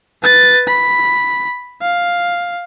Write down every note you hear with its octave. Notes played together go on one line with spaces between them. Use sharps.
B4 A6
B5
F5